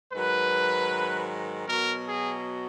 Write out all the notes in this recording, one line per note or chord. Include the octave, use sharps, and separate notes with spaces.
G#2 D#3 F#3 B4
B2 F#3 A#4
G#4